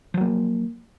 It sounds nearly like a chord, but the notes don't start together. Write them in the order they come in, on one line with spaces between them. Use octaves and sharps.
F3 F#3 A#3